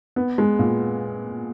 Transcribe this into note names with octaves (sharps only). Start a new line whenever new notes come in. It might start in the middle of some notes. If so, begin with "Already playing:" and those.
B3
G#3
A#2